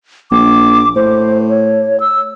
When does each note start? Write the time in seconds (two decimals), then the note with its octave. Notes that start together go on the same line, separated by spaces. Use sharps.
0.31 A#1 D6
0.96 A2 C5
1.50 C#5
2.00 E6